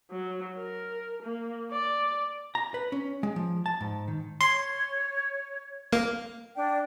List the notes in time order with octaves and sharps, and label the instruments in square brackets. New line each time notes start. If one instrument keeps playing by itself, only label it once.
[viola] F#3
A#4
A#3
D5
[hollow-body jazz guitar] A#5
B4
C#4
G#3
F3
A5
G#2
D#3
[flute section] C#5 [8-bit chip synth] C6
[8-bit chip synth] A#3
[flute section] D4 D5 G5